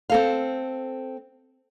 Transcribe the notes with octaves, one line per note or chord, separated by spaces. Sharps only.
C4 A4 F5